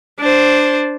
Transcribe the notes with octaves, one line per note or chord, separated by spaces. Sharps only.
D4 C5